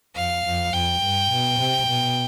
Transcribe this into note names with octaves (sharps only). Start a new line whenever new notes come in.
F2 F5
F2
F2 G5
G2
B2
C3
B2